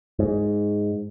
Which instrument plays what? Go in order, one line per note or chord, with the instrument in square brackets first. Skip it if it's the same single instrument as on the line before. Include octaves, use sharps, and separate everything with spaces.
[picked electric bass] G#2